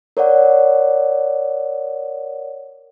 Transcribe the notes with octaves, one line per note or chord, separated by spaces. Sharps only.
A#4 C#5 D5 F#5